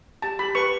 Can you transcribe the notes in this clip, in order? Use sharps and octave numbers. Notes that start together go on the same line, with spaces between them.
G4 A5
G4 B5
B4 C#6